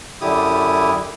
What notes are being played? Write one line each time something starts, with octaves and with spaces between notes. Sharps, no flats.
F#2 D3 E4 G4 D#6